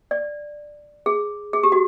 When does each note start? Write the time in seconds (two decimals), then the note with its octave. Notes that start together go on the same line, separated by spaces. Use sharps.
0.11 D5
1.06 G#4
1.53 G#4
1.63 G4
1.72 F#4